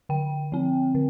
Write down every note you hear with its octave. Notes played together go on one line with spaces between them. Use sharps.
D3 G5
F3 C4
D3